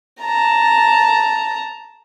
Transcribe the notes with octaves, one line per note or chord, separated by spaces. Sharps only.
A5 A#5